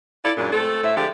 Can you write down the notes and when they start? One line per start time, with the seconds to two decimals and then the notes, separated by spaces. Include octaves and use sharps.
0.25 E4 F4 A4 D5
0.37 F#2 A#2 G#3 D4
0.52 A3 C4 A4
0.84 A2 C5 E5
0.96 D3 F3 G#3 G4 D5